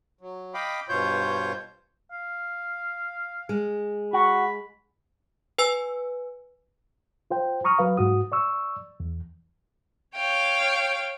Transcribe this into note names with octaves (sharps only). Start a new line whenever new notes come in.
F#3
D#5 F5 G5 B5 D6
G2 B2 F4 C5 C#5 G6
F5
G#3
F#4 B5
B4 G#5 E6
F4 C5 G5
A#5 C#6 D#6 F6
F#3 B4 F5
G#2 F#4 D#6
D5 C#6 E6
E2
C#5 F5 G5